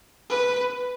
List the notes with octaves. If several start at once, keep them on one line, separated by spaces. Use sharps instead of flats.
B4